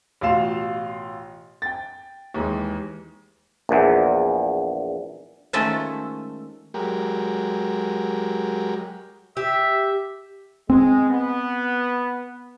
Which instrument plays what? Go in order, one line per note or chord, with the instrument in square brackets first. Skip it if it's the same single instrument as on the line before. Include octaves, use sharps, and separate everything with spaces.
[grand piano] A1 B2 F4 F5 E7
G5 A6
D#2 E3 G#3
[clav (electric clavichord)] A#1 E2
[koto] D#3 G#3 A3 C#4 F4 C5
[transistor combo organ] F#3 G#3 G4 A#4
[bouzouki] G4 [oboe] E5
[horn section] G#3 [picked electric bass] C4
[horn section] B3